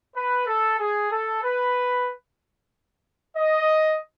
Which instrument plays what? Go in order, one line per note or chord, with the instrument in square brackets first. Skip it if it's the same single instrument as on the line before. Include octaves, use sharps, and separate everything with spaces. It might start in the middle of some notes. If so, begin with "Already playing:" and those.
[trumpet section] B4
A4
G#4
A4
B4
D#5